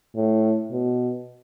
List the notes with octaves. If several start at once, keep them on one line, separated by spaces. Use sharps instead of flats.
A2
B2